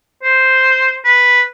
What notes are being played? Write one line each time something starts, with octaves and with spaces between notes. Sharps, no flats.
C5
B4